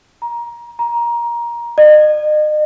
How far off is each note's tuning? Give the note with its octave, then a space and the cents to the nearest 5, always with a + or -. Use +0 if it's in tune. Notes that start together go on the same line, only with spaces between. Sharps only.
A#5 +25
A#5 +20
D#5 -40